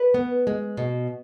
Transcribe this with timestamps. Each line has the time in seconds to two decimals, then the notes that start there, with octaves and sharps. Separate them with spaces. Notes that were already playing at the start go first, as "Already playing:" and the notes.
Already playing: B4
0.14 B3
0.47 G#3
0.77 B2